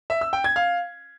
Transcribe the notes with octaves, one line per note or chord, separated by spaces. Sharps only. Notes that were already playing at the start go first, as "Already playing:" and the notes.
E5
E6
G5
G#6
F5